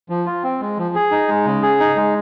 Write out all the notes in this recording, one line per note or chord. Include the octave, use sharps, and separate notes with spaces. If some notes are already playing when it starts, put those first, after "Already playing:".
F3
F4
C4
G#3
F3
G#4
D#4
G#3
C#3
G#4
D#4
G#3